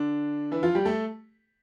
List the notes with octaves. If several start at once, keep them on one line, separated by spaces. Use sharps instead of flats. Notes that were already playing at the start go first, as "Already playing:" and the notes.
Already playing: D3 D4
E3 E4
F3 F4
G3 G4
A3 A4